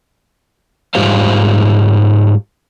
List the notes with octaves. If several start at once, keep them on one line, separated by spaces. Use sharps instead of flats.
G#2 G3 F4 G4 C5 F5